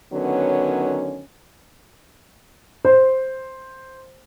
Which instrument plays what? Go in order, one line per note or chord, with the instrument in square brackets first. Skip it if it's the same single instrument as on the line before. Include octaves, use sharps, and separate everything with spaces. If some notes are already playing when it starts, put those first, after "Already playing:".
[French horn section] D3 D#3 F#3 B3 C#4
[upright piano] C5